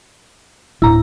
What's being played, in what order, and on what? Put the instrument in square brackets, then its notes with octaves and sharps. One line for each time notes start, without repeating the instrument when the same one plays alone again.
[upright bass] D1 [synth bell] E4 A#5